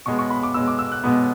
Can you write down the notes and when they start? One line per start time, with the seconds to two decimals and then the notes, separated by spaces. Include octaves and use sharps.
0.06 B2 G#3 B3 C#6
0.19 C#6
0.30 B5
0.43 D6
0.54 B2 G#3 B3 E6
0.68 D6
0.79 E6
0.92 F#6
1.04 B2 G#3 B3